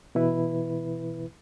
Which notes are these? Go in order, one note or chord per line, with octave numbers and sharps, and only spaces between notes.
B2 E3 E4 B4